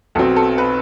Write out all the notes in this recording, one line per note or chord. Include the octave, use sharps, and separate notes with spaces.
B1 B2 F#3 C4 A4
A4
B4